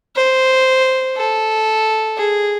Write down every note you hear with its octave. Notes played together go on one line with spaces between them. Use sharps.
C5
A4
G#4